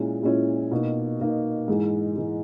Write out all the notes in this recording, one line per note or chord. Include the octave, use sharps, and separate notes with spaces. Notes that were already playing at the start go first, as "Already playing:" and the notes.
Already playing: A#2 G#3 C#4 E4
A#2 G#3 C#4 E4
B2 A#3 D#4
B2 A#3 D#4
G#2 E3 G#3
E3 G#3